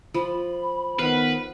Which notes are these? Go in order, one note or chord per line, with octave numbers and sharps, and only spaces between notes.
F3 B5
D#3 B3 B4 F5